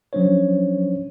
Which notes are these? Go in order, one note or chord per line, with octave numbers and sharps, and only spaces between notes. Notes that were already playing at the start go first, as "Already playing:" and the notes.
F3 F#3 C#4 D4 C5 C#5